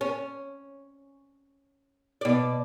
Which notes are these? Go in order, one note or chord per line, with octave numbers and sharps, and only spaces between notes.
C#4
B2 D5